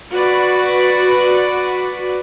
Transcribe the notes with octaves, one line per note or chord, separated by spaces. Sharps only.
F#4 B4 D5